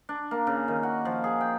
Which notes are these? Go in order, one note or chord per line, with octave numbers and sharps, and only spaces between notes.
D4
A#3
C#3
D#3
F#4
F3
G#4
G5